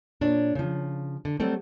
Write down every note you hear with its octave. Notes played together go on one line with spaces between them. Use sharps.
A#2 D4 C#5
C#3 F3
D3
F#3 G3 A3 C4